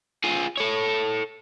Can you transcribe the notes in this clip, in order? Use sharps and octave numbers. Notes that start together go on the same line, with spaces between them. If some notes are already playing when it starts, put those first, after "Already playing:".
F4 G#4
A4 C#5